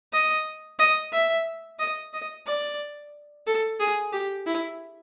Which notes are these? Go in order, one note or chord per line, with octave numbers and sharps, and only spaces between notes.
D#5
D#5
E5
D#5
D#5
D5
A4
G#4
G4
E4